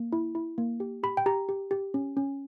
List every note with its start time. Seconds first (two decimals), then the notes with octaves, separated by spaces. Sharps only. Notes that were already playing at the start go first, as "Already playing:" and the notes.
Already playing: A#3
0.13 E4
0.35 E4
0.58 A#3
0.80 G4
1.03 G4 B5
1.17 G5
1.26 G4 A#5
1.49 G4
1.71 G4
1.94 C#4
2.17 C#4